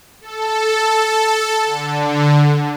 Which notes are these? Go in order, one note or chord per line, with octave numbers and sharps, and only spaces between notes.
A4
D3